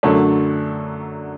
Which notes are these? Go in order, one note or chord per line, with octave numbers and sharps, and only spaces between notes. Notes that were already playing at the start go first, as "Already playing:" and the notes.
F#2 D3 F#3 A3 D4